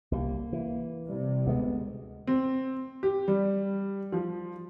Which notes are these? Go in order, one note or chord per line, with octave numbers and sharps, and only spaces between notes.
C2 G3 A#3
E3
C3 G3
D2 G#3 B3
C4
G4
G3
F3